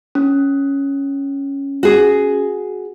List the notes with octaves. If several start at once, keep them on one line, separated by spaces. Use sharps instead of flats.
C#4
F#4 G#4